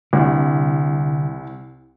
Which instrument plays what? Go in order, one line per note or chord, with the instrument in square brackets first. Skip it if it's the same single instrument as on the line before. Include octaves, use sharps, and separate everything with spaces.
[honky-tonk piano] C2 [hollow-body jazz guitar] D3